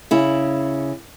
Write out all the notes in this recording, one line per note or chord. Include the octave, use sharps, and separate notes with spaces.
C#3 E4